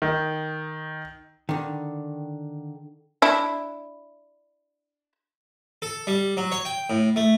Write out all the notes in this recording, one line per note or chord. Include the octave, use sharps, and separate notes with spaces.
D#3
D3 D#3
D4 E4
A4
G3
F#3
C#5
G5
A2
A3